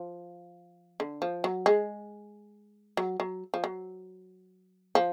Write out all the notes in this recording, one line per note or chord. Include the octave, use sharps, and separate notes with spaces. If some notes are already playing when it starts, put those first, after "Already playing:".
Already playing: F3
D3
F3
F#3
G#3
F#3
F#3
F3
F#3
F3